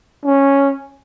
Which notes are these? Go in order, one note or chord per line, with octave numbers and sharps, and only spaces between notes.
C#4